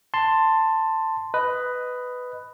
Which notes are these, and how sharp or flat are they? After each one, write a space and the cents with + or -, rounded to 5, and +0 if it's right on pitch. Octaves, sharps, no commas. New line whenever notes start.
A5 +10 C6 +0
B4 +10 D#5 +0